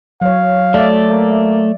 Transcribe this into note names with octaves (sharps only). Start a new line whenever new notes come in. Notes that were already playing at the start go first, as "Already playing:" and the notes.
F#3 C#5 F5
A3 D5 E5
A#3